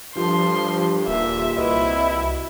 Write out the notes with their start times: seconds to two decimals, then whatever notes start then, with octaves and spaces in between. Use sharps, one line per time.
0.16 G2 F3 G4 A4 C6
1.08 D#1 A#2 E5
1.57 C2 E4 F#4 B4 D#5